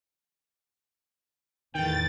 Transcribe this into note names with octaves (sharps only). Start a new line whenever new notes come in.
E2 A2 D#3 E3 G5 A6